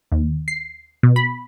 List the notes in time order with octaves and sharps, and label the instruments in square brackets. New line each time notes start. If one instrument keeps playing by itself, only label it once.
[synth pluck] D#2
C7
B2
B5